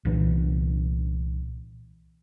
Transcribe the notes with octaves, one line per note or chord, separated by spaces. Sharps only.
C2 A#2 E3